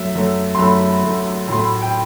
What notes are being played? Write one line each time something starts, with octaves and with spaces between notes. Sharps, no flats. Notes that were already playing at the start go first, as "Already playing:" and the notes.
Already playing: F#2 F#3 A3 E5
F#2 F#3 A3
C6
F#2 F#3 A3 B5
F#2 F#3 A3
A2 F#3 A3 C6
B5
G5